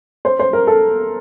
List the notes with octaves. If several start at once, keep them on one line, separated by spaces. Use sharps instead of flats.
C5
C5
A#4
A4